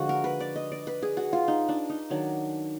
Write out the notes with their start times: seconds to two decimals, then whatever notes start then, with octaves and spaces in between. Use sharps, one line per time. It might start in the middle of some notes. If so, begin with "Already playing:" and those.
Already playing: D3 F3 G#3 F#4
0.09 A#4
0.24 B4
0.40 D5
0.56 D#5
0.72 D5
0.87 B4
1.02 G#4
1.17 F#4
1.33 F4
1.48 D#4
1.69 D4
1.90 D#4
2.10 D#3 F#3 D4